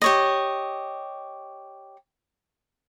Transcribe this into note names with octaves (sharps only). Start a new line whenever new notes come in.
G4 C#5 D#5